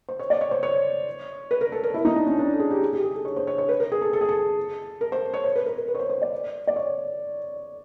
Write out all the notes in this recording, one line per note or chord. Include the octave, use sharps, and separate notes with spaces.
C5
C#5
D5
C#5
C5
C#5
B4
A#4
A4
A#4
E4
D#4
D4
C#4
D4
A4
G#4
G4
G#4
G4
G#4
A4
C#5
C5
C#5
C#5
B4
A#4
G#4
A4
A4
G#4
A4
A#4
C5
C#5
C5
B4
A#4
A#4
B4
C#5
C5
C5
D5
D5
C#5